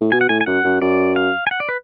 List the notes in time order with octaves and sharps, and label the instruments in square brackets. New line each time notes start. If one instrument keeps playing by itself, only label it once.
[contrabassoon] A2
[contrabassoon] B2 [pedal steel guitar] G#5
[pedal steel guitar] F#5
[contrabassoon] A2 [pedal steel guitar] G#5
[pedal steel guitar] G#5
[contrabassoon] F#2 [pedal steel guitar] F#5
[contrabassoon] F#2
[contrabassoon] F#2 [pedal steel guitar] D5
[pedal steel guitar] F5
G#5
F#5
D5
B4